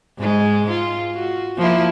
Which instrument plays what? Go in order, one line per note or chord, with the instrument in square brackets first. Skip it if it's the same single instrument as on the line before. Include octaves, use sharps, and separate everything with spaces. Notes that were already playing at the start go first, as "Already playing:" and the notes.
[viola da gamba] G#2 G#3
F4
F#4
F3 A#3 E4